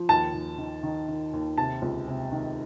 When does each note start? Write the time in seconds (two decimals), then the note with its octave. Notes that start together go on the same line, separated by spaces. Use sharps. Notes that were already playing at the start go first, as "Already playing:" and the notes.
Already playing: F3
0.09 D#2 A5
0.34 D#2
0.58 D#3
0.83 D#3
1.08 D#3
1.33 D#2
1.58 C3 A5
1.82 C#2
2.08 C3
2.32 D#3